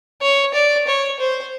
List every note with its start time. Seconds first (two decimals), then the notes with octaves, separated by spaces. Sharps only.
0.22 C#5
0.54 D5
0.87 C#5
1.19 C5